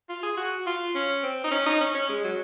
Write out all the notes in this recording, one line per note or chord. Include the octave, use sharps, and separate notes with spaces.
F4
G#4
F#4
F4
C#4
C4
D#4
C#4
D#4
C#4
C#4
G#3
F#3